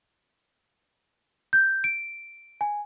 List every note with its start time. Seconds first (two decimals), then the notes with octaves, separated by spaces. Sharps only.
1.53 G6
1.84 D7
2.61 G#5